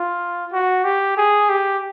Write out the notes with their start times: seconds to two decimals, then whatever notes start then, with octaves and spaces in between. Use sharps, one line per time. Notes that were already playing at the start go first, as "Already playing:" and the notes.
Already playing: F4
0.53 F#4
0.84 G4
1.17 G#4
1.49 G4